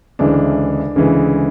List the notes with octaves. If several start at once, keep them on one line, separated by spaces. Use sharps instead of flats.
D2 C#3 E3 G#3 D4
D2 C#3 E3 G#3